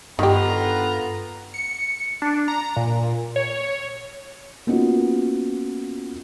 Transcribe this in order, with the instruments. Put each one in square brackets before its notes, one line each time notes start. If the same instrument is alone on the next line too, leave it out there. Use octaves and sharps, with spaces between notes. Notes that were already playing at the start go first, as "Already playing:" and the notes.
[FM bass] G2 [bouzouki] D3 [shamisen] D#3 G4 [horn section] B3 F4 A#5
[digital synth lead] C#7
D4
A#5
A#2
C#5
[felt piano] A#3 B3 C#4 D#4 F4 F#4